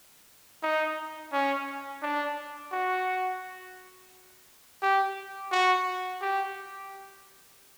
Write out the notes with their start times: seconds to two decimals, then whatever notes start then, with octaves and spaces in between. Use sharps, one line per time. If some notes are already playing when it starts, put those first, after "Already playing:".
0.62 D#4
1.32 C#4
2.02 D4
2.72 F#4
4.82 G4
5.52 F#4
6.21 G4